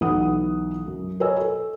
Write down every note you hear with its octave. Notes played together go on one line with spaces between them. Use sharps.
B1 E3 F#5 D#6
F#2
A#4 B4 C#5 D#5 G#5 E6
A4